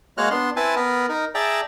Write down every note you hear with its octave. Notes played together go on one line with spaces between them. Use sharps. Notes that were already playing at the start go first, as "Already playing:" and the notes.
G#3 A#3 F#4 C#5 F6 F#6
B3 D4 C6
C4 E4 B4 G#5 A5
B3 A#4 B4
D#4 A#4
G#4 D5 E5 G5 A5 A#5